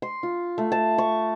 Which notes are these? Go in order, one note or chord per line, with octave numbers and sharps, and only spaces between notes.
C6
F4
A3
A5
C#6